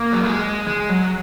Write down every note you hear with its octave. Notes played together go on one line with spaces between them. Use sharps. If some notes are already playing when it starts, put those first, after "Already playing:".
Already playing: A#3
F#3
G#3
G#3
F#3